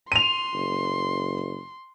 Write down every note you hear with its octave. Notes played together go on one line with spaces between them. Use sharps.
C6 D#7 F7
F#1